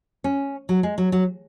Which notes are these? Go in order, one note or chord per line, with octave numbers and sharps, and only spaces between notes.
C#4
F#3
G#3
F#3
F#3